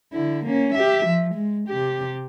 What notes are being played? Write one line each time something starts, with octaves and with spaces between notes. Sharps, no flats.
D3 E4
A#3 C#4
G4 E5
F3
G#3
C3 G4